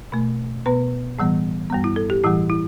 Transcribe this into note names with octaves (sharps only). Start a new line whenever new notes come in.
B2 A3
B2 B3 B4
A2 E3 G3 B3
G2 G3 B3
E4
A4
G4
A2 E3 G3 E4
E4